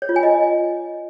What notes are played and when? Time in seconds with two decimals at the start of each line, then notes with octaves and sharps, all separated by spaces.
0.02 C#5
0.09 F4
0.16 G#5
0.23 D#5